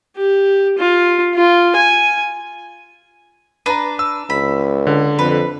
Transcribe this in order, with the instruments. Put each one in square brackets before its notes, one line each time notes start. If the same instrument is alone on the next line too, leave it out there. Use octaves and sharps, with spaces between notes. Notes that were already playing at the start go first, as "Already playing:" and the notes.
[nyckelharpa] G4
F4
F4
G#5
[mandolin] D4 B4 [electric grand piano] A#5 D#7
[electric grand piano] E6
[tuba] C#2 [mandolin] B5
[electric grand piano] D3
[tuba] F2 [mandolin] B4